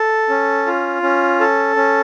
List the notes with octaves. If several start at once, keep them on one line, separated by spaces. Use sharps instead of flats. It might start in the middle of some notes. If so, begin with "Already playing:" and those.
Already playing: A4
C#4
F4
C#4
A4
C#4